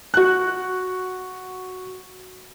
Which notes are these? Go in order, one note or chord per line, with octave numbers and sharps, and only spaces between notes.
F#4 F#6